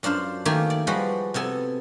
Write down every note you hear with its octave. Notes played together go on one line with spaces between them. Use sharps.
F#2 D4 F4 C5 F5
D#3 A3 A#3 G4 G#5
D5
F3 G3 G#3 F#4 B4
C3 B3 A4 G#5